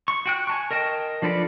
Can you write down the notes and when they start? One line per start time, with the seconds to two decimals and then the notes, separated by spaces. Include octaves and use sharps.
0.08 C#6
0.26 F#4 G5 F#6
0.47 G#5 A5 C#6
0.71 A#4 D#5 G5 A5
1.22 F3 D4 A4 B4 D5